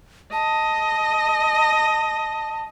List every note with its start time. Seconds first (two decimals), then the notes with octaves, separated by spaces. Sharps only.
0.32 D#5 A5